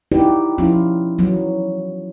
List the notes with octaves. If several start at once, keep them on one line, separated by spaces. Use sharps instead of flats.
D#4 E4 F#4 G4 B4 D5
F3 B3 C#4 E4 F4
E3 F#3 B3